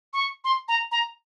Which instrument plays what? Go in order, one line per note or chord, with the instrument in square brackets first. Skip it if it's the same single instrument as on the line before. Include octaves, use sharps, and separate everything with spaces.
[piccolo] C#6
C6
A#5
A#5